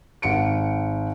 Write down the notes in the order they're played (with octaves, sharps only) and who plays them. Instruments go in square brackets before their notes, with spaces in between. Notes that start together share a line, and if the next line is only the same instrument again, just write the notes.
[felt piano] G#1 F#5 C#7 D7